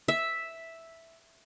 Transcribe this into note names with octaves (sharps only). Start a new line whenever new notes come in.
E5